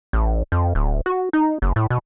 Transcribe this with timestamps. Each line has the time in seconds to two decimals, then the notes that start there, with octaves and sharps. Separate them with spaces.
0.13 A1
0.52 F2
0.75 D1
1.06 F#4
1.33 D#4
1.62 F#1
1.76 A2
1.90 B2